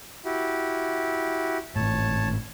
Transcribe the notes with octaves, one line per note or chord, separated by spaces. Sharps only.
E4 F#4 G4
G#1 A2 C#5 A5